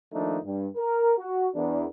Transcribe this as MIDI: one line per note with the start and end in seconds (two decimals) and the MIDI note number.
0.13 0.38 51
0.13 0.38 53
0.13 0.38 57
0.13 0.38 58
0.13 0.38 62
0.13 0.38 63
0.44 0.67 43
0.76 1.13 70
1.18 1.48 66
1.55 1.86 40
1.55 1.86 62
1.55 1.86 70